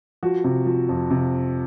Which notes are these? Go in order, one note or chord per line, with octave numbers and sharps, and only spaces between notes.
F3 F#4
C3
F3
F2
C3